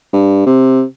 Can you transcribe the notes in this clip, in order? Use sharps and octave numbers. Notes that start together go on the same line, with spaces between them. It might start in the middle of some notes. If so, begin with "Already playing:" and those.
G2
C3